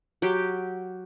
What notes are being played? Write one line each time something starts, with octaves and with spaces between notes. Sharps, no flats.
F#3 G4